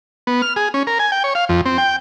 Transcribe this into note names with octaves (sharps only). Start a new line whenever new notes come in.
B3
F6
G#4
C#4
A#4
G#5
G5
C#5
F5
F2
C4
G5